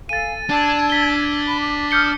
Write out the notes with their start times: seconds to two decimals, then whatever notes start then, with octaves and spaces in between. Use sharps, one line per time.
0.09 A4 F5 G#5 A6 D#7
0.50 D4 A5 E6 G#6
0.90 B6 G7
1.47 B5
1.60 D6
1.91 D#6 F6 G6 C#7 G7